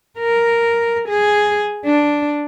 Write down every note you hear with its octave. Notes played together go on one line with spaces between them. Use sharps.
A#4
G#4
D4